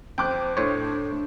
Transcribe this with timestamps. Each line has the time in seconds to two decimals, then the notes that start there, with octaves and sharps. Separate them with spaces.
0.18 F2 C5 G5 D6 F#6
0.57 A2 D4 C5 C#5